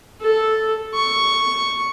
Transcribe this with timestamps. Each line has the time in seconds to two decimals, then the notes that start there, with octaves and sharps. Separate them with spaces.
0.21 A4
0.94 C#6